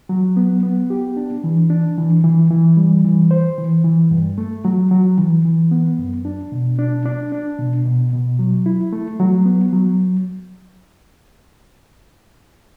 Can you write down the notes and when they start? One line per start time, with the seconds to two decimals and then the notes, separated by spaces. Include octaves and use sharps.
0.09 F#3
0.37 B3
0.63 B3
0.90 G4
1.17 D4
1.44 E3
1.70 D4
1.98 E3
2.24 E3
2.50 E3
2.77 G3
3.05 E3
3.31 C5
3.58 E3
3.84 E3
4.11 G2
4.38 A3
4.65 F#3
4.91 F#3
5.18 E3
5.45 E3
5.71 B3
5.99 F#2
6.25 D4
6.52 B2
6.79 D4
7.06 D4
7.32 D4
7.59 B2
7.86 B2
8.13 B2
8.39 F#3
8.66 E4
8.93 A3
9.20 F#3
9.46 B3
9.73 F#3